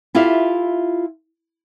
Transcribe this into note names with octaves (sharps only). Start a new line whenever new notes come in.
E4 F4 G4 A4 E5 F5